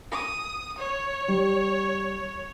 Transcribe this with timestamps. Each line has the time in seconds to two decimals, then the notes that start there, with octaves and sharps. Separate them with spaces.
0.12 D#6
0.78 C#5
1.28 G3